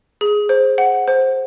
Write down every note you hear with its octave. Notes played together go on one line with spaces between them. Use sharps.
G#4
C5
F#5
C5